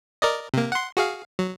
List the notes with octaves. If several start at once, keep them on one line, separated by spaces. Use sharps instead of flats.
A#4 D5 D#5
C3 A#3
F#5 C6
F#4 G#4 F5
F#3